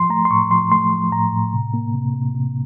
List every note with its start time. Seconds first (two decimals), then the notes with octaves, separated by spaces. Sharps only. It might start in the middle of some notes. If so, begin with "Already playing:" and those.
Already playing: F3 C6
0.10 A3 A#5
0.25 C6
0.30 A2 C#6
0.51 F3 C6
0.72 A3 C6
0.92 F3
1.12 A2 A#5
1.32 A2
1.53 C3
1.74 A#3
1.94 C3
2.14 C3
2.34 C3